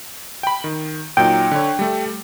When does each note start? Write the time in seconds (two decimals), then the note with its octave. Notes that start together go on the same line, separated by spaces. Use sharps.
0.43 G5 B5
0.64 D#3
1.17 A#2 F#3 D#4 G5
1.52 D3 C#5
1.79 G3 A3